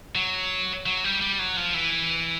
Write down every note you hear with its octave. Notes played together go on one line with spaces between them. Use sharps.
F#3
F#3
G3
G3
F#3
F3
E3